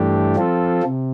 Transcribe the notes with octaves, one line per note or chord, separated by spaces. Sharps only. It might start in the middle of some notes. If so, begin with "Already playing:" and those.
Already playing: G2 E3 A3 D4 G4
F3 C4 F4 A4
C3